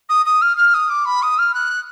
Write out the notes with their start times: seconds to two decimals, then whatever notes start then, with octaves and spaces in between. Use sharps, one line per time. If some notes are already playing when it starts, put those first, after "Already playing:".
0.09 D#6
0.26 D#6
0.42 F6
0.57 F6
0.74 D#6
0.90 D6
1.05 B5
1.22 D#6
1.38 F6
1.54 F#6